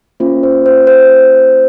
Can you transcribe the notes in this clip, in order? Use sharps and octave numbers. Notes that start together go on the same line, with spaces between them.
A#3 C#4 F4 C5
C5
C5
C5